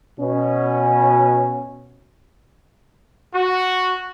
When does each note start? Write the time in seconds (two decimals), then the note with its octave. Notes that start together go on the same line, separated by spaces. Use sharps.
0.20 B2 C#4
3.35 F#4